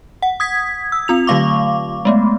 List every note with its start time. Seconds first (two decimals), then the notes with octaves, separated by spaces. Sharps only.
0.22 F#5
0.40 D#6 G#6 B6
0.92 E6
1.08 C4 F4 F7
1.27 D3 F#3 A3 F5 C#6 D6
2.05 G#3 A3 B3